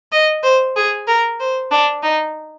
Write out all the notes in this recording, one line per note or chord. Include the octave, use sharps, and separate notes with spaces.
D#5
C5
G#4
A#4
C5
D4
D#4